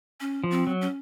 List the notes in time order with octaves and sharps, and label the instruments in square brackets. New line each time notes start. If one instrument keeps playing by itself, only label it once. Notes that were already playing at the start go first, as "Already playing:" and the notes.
[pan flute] C#4
[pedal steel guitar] F3
[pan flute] C4
[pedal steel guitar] F#3
[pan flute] C#4